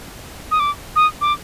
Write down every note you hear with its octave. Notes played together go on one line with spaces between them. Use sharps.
D#6
D6
D#6
D6